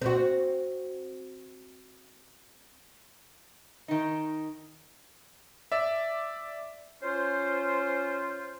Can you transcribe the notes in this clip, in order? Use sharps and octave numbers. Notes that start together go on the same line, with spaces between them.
C4 F#4
D#3 D#4
D5 E5
C#4 F4 C5